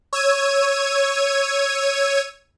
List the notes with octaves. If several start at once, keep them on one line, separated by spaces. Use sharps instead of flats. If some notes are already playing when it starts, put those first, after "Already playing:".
C#5 E6 G#6 D#7